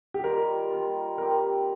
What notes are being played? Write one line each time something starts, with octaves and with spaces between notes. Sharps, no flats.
G4
D#3 G3 A#3 F4 A#4
D#3 G3 A#3 F4
G3 C4 G4 A#4